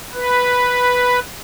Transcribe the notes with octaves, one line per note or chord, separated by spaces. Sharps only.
B4